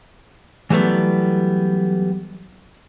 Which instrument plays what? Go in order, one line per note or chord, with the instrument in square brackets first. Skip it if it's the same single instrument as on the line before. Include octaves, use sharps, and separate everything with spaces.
[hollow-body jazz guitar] E3 F#3 G3 A3 B3